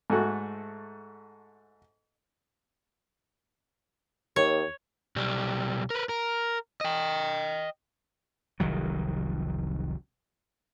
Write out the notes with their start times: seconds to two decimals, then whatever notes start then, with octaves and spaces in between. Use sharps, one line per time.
0.10 G#2 A3 F#4
4.36 D#2 C#5
5.16 B1 G3
5.90 A#4 B4
6.09 A#4
6.81 D#5 G5
8.60 F1 C2 D#3 F#3